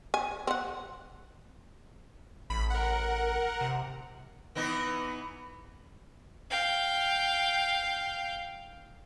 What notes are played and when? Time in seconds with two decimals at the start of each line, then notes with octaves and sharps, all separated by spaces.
0.14 G#5
0.47 C4 F#5
2.50 A1 B5
2.70 A#4 F#5
3.61 C3
4.55 E3 B3 D#4
6.50 F5 G5